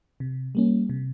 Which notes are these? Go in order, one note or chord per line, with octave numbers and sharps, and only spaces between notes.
C3
G3 A#3 C#4
C3